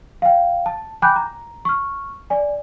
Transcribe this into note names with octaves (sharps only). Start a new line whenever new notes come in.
F5 G5
A5
G5 G#5 B5 D6 F#6 G6
A#5
C#6 F6
D5 G#5